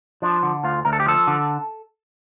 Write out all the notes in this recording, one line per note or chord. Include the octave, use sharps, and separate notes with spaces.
F3 D4
D3
D2 F4
D2 A#4
A4
G4
F3 A4
D3